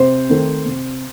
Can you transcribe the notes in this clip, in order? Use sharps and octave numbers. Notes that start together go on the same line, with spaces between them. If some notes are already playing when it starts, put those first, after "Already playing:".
Already playing: C3 C5
D#3 A3 C4
C3